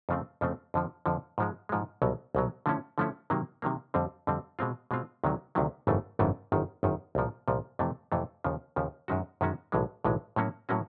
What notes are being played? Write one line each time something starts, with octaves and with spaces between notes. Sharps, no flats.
F2 C#3 F3 A3 C4
F2 C#3 F3 A3 C4
F2 D3 F3
F2 D3 F3
G#2 F3 G#3
G#2 F3 G#3
C2 B2 F#3
C2 B2 F#3
D3 F3 A3 C#4 E4
D3 F3 A3 C#4 E4
C3 D#3 F#3 A#3
C3 D#3 F#3 A#3
F2 D3 G3 C4
F2 D3 G3 C4
B2 G#3 C4 F4
B2 G#3 C4 F4
D2 C3 D#3 F#3
D2 C3 D#3 F#3
G#1 F#2 C#3 E3 A3
G#1 F#2 C#3 E3 A3
G1 F#2 D#3
G1 F#2 D#3
C2 A#2 F3
C2 A#2 F3
F2 C3 E3 A3
F2 C3 E3 A3
D#2 C#3 F3
D#2 C#3 F3
F#2 D#3 G#3 C#4 F#4
F#2 D#3 G#3 C#4 F#4
B1 A2 E3 G#3
B1 A2 E3 G#3
A2 F#3 A#3 C#4 F#4
A2 F#3 A#3 C#4 F#4